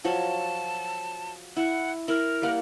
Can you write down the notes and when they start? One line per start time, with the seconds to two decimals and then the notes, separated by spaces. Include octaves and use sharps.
0.04 F3 F#3 C#5 A5
1.56 E4 F#5
2.08 E4 A#4
2.42 G3 A#3 F#5